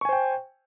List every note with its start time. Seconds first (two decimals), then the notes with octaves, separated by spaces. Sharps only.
0.01 C#6
0.05 G#5
0.09 C5
0.13 G5